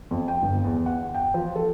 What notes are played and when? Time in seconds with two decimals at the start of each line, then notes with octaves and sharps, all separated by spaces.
0.11 F2
0.28 G5
0.42 G1
0.64 E2
0.86 F#5
1.14 G5
1.34 F3
1.56 A4